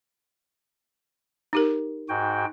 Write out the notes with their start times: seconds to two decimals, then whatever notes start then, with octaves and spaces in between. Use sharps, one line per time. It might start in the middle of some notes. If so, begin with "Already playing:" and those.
1.53 D#4 G4 A#4
2.09 G#2 F#4 G5